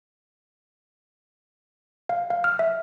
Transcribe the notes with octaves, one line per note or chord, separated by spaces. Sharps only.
F5
F5
F6
E5